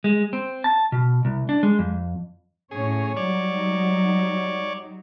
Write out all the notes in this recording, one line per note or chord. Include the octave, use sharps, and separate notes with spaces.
G#3
C4
A5
B2
C2
D4
G#3
F2
A2 C#4 G#4 C#5
F#3 G3 D#4 C#5 D5